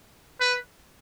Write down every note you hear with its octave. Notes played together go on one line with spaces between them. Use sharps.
B4